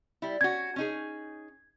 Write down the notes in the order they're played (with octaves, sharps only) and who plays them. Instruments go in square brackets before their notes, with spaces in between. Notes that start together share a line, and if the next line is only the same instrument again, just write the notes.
[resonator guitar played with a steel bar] G3 E4
[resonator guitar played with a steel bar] C#4 F#4 [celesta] G#6
[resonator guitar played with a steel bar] C#4 D#4 G#4